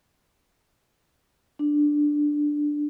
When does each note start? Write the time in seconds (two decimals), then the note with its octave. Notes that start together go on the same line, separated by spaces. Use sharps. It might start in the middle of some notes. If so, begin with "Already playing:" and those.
1.59 D4